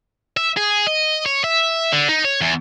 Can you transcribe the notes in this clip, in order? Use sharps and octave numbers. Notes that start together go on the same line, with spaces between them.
E5
G#4
D#5
C#5
E5
D3
D#4
C#5
E2